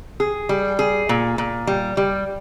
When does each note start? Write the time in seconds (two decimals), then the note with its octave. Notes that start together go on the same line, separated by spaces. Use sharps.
0.20 G#4
0.49 G3
0.79 G#4
1.09 A#2
1.38 A#2
1.67 G3
1.97 G3